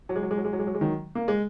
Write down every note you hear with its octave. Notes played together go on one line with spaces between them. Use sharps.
F#3
G#3
F#3
G#3
F#3
G#3
F#3
G#3
F#3
G#3
D#3 F#3
A#3
G#3